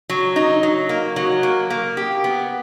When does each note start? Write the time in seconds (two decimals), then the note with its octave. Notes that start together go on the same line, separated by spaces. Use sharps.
0.09 F#3
0.36 D#4
0.63 F#3
0.89 A#3
1.16 F#3
1.43 A#3
1.70 A#3
1.97 G4
2.24 B3